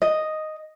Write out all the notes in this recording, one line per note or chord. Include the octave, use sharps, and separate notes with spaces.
D#5